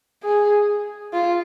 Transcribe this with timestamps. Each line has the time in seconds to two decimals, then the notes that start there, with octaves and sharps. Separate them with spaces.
0.24 G#4
1.13 F4